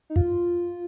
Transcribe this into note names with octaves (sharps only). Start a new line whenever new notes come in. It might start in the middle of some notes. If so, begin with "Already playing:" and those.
D#4
F#2 F4